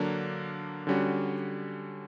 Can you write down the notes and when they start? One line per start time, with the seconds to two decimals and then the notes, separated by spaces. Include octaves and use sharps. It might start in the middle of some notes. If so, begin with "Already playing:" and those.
Already playing: D3 F#3 A#3 D4 A#4
0.87 D3 G3 C#4 F#4